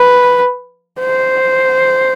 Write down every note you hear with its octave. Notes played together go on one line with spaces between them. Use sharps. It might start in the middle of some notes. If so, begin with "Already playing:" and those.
Already playing: B4
C5